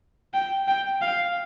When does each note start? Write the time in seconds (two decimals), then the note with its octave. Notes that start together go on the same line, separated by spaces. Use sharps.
0.34 G5
0.68 G5
1.02 F5